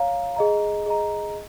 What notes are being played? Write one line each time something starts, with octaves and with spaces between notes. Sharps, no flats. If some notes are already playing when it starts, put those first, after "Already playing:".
Already playing: C#5 F5 A#5
G#4 D#5 A#5
G#4 D#5 A#5